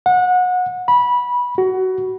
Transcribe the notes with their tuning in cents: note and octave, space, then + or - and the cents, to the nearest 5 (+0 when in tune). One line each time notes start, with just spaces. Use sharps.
F#5 -25
B5 -15
F#4 +20